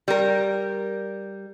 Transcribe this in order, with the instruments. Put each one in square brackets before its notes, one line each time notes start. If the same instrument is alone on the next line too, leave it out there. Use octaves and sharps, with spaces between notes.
[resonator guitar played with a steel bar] G3 A#4